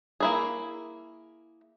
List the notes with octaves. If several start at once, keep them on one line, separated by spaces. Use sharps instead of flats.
A#3 E4 G#4